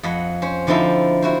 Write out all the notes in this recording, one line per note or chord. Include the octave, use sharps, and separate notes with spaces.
F2 D#5 F#5 B5
C#4 C5
D3 F3 C4 D#4 E4 G5
E4 F#4 C5